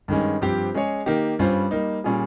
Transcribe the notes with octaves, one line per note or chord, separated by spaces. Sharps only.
G2 D#3 G#3 C#4
G2 F3 C4 G4 C5
G#3 C#4 G#4 C#5
D#3 A#3 D#4 G4
G2 G3 C#4 F4 C5
G3 A#3 D#4
A#2 G3 C#4 F4 G#4